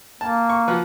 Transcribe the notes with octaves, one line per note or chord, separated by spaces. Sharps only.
A#3 A5
C#6
F3 F#4 B4